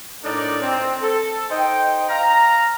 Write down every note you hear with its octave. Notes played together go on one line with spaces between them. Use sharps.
A2 D4 D#4 A#4 D5
C4
A4
D#4 C5 G5
F5 A#5